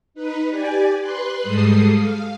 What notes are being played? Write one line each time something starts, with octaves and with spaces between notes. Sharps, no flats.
D#4 B4
G4 D5 G#5
B4 C6 F#6
G#2 G3 G#3 A4 D#6 C7
F5